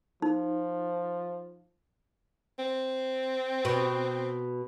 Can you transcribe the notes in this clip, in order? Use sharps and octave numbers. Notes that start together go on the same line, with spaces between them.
F3 D#4
C4
B2